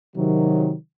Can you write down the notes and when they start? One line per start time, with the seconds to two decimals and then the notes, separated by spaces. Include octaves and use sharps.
0.16 C3 D#3 F#3